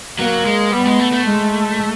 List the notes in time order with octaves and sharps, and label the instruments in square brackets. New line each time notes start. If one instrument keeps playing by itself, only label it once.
[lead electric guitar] F#3 [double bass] A#3
[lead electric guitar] G#3
[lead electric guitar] G3 [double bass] B3
[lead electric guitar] G#3
A3
A3
[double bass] G#3